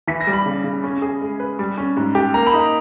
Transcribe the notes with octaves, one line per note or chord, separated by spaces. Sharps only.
E3 B6
A#6
G3
B5
C#3
C#3
C#4
G#4
G#3
B4
G3
C#4
G#2
G4
A#3 A#5
B5
D#4
A#5